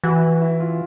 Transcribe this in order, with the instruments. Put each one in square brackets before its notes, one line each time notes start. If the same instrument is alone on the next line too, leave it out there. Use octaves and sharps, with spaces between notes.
[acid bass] E3 [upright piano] F#4
[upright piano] E4
F4